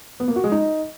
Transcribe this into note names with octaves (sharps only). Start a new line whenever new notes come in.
B3
A#3
F#4
G#3
D#4